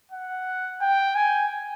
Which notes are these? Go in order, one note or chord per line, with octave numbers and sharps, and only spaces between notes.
F#5
G5
G#5